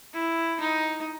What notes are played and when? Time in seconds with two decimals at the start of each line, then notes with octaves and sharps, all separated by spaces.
0.13 E4
0.60 D#4